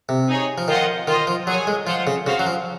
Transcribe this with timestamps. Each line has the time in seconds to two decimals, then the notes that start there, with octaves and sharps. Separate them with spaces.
0.09 C3
0.28 D#4 G#4 C#5
0.58 F3
0.68 D#3 F4 C5 D#5 F#5
1.08 D#3 F4 C5 D#5
1.27 F3
1.47 F#3 G#4 C#5 G#5
1.67 G#3
1.86 F3 F4 C5 F#5
2.07 C#3
2.26 C#3 C#4 F#4 C5 F5
2.39 F#3
2.47 F3